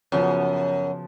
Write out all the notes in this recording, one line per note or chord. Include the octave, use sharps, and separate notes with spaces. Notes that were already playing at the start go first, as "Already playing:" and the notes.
F#2 C#3 F3 B3 F#4